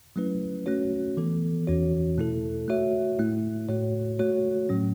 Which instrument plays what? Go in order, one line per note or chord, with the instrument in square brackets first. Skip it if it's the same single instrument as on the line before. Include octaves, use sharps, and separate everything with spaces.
[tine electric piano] F#3 A3 C#4 E4 B4
A3 C#4 F#4 C#5
E3 B3 A4
E2 E3 C#4 F#4 C#5
B2 A3 E4 A4
A3 F#4 C#5 E5
A2 A3 E4
A2 A3 F#4 C#5
A3 F#4 C#5
A2 F#3 C#4